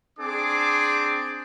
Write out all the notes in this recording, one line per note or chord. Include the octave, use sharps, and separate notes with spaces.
C4 D4 G#4 D6